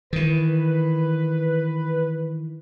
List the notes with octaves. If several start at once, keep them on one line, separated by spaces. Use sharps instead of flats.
D#3 E3 B4